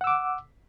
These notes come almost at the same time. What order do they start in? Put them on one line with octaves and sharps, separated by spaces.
F#5 E6 D6